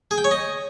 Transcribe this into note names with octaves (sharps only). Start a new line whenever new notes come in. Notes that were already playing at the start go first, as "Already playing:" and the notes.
G#4
G5
C#5
D#5